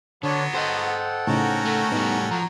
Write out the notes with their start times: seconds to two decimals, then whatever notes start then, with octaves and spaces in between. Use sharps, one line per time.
0.23 D3 F#3 B3 D4 C#5 A5
0.54 A4 C5 D#5 F#5 G5 C6
1.27 A2 C#3 C#4 D#4 F#4 A#4
1.65 A3
1.92 A2 G3 B3 D#4
2.31 F3 F#3 A#5